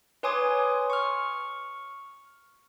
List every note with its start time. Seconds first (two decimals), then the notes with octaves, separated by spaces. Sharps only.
0.23 B4 C#5 G#5 C6 D6 D#6
0.90 C#6 F6